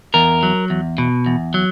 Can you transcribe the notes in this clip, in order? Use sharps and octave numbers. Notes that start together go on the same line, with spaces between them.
E2 A#4
F#3
E2
B2
E2
F#3